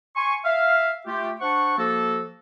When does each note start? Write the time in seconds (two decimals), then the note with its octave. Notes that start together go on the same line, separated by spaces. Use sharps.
0.16 G#5 C6 C#6
0.45 E5 F5
1.07 A3 F4 G4
1.41 D4 C5 F#5 C#6
1.78 F3 A#3 F#4 A4